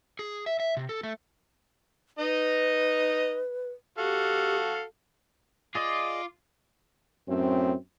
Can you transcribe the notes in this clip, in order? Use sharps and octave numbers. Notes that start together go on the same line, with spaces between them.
G#4
E5
E5
C3
A4
A3
D#4 B4 D#5
F#4 G4 A4 F5
F4 G#4 D5 D#5 D6
F#2 A2 C4